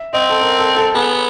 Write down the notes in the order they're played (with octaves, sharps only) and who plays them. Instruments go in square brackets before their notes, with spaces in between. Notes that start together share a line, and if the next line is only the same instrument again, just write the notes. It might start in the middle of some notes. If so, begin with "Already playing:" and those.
Already playing: [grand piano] E5
[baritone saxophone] C4 [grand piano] D#5
[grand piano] A4
A#4
A4
A4
[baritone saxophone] B3 [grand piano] G#4